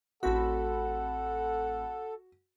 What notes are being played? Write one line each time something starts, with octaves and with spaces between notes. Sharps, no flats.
A1 C4 F#4 A4 F#5 B5